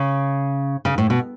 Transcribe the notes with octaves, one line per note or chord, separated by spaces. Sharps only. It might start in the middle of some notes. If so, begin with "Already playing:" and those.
Already playing: C#3
C#3
A2
B2